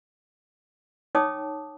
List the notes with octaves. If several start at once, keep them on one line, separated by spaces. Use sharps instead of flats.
D#4 C#5 G5 A5 D6 D#6